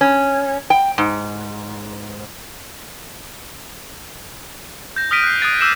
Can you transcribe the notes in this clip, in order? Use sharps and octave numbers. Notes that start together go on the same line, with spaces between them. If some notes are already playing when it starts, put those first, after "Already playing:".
C#4
G5
G#2
G6 A#6
D#6 F6 A#6 B6 D7 D#7
F#6 C7
D#6 F#6 G#6 A6 C7
D6 E6 G6 C7 D#7 E7